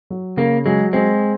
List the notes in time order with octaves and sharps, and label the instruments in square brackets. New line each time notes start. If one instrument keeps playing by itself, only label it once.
[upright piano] F#3
[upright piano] C#3 [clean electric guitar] A#3
[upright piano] F#3 [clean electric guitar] G#3
[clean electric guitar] G#3 [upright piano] C4